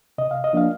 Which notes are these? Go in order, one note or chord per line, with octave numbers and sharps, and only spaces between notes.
C3 D#5
F5
D#5
F3 A#3 D4 F5